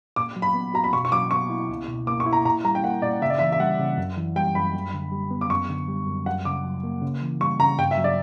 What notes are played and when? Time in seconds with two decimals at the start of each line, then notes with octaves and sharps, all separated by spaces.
0.16 A#2 D6
0.36 F#3
0.42 B5
0.54 B3
0.74 F#4 A#5
0.84 B5
0.93 B2 C#6
1.05 C#6
1.12 F#3 D6
1.31 B3 C#6
1.50 E4
1.69 C#2
1.88 B2
2.07 A#3 D6
2.20 C#6
2.26 E4
2.33 A#5
2.45 A#2 A#5
2.65 G3 A#5
2.75 G5
2.83 A#3 F#5
3.02 A#2 D5
3.22 C#3 E5
3.30 D5
3.39 E3 E5
3.52 E5
3.60 G3 F#5
3.79 C#3
3.98 F#2
4.17 E3
4.36 G3 G5
4.55 F#2 B5
4.74 F#2
4.94 D3
5.12 G3
5.31 B3
5.41 D6
5.50 F#2 C#6
5.69 D3
5.88 G3
6.07 F#2
6.26 F#2 F#5
6.45 C#3 D6
6.65 F#3
6.84 A#3
7.02 C#3
7.22 E3
7.40 G3 C#6
7.60 C#3 A#5
7.78 G2 G5
7.91 E5
7.98 F#3
8.04 D5